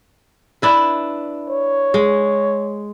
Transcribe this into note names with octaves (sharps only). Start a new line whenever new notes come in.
D4 E4 B4
C#5
G#3